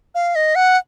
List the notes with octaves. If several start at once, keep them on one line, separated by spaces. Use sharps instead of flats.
F5
D#5
F#5